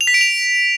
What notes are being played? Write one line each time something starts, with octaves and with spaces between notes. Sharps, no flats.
F7
B6
D7
F7